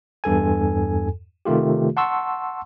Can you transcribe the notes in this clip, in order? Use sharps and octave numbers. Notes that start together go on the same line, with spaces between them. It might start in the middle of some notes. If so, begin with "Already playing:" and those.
E2 G2 A4 G#5
C3 D#3 A3 F4 G4
F#5 A5 C6 C#6 E6